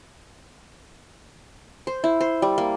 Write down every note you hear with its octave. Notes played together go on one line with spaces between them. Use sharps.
C5
E4
C5
G3
A#3